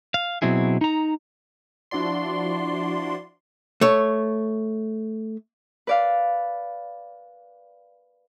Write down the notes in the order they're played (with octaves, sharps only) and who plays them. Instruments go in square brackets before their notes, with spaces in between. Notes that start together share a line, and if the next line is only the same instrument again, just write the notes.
[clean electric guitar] F5
B2 F#3 C4 E4 G#4
D#4 A#5
[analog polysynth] F3 D4 E4 F#4 D5 C6
[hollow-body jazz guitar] A3 C#5
[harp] B4 D5 F5